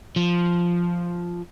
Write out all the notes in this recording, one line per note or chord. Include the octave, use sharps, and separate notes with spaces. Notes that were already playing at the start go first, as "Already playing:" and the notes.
F3